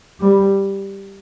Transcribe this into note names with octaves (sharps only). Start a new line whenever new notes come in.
G3